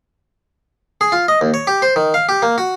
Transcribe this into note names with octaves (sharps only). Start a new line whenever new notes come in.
G#4
F4
D#5
D#2
C#5
G4
C5
D#3
F5
G4
A#3
F#4